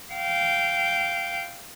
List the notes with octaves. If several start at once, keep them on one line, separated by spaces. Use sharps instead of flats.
F5 G5